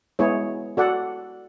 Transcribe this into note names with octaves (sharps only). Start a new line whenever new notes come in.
G#3 B3 E4 G#4 C#5
F#4 A4 D5 F#5